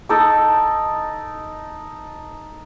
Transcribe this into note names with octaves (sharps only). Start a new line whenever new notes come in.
D#4 A4 D6